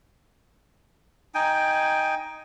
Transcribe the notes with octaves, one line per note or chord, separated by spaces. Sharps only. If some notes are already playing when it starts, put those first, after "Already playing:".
D#4 G5 G#5